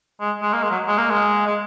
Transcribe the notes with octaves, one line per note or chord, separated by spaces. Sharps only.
G#3
G#3
A#3
G#3
F#3
G#3
A#3
G#3
G#3